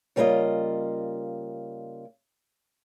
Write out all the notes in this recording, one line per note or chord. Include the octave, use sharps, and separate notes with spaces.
C#3 G3 A#3 D4 F4 D#5